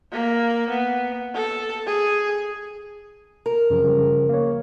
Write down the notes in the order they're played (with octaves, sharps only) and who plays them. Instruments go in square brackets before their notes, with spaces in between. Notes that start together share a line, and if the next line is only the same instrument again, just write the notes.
[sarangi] A#3
B3
A4
G#4
[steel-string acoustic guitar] A#4
[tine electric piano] F#2 C#3 F3
C#3 F3 G3
A#3 C#5